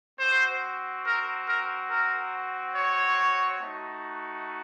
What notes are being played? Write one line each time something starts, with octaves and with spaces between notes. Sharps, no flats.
C4 F#4 C5
A#4
A#4
A#4
C#5
A3 D#4 F#4